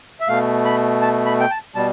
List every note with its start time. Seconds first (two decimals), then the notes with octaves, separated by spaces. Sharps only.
0.20 E5
0.28 B2 A3 F5
0.65 B5
1.02 A5
1.26 B5
1.40 G5
1.51 A5
1.75 B2 G3 A5